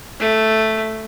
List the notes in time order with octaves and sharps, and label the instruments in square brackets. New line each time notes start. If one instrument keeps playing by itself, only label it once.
[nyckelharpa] A3